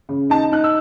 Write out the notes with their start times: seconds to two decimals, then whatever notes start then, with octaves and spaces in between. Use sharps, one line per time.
0.09 C#3
0.30 D#4 A5
0.52 D#4 F#6
0.64 E6